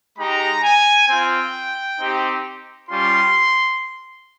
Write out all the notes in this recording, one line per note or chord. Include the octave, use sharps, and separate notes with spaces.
G#3 D#4 G4 A#5
G#5
C4 F4 G5
C4 D#4 G4
G3 C#4 F4 C6